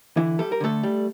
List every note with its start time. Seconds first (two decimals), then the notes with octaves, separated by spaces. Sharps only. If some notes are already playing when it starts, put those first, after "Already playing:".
0.17 D3 E3 E4
0.39 G3 A4
0.52 A#4
0.61 D3 A3 A4
0.83 G3